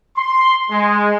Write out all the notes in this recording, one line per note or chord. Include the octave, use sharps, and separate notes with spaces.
C6
G#3